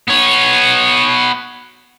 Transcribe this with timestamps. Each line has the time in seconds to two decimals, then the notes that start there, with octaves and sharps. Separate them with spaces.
0.08 B3 C#5